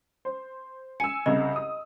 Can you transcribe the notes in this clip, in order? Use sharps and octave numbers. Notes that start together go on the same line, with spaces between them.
C5
G#5 E6 C#7
C2 C#3 D#5
D#6